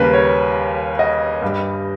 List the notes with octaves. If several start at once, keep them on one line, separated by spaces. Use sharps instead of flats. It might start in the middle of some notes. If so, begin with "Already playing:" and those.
Already playing: D#2 C#3 G3 A#4 B4
C#5
D#5
G2 G3